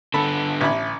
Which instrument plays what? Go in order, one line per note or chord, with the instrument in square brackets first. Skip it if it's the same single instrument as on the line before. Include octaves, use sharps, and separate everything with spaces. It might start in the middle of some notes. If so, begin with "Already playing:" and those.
[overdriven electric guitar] D3 B3 [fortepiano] A4 B5
[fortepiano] A1 B5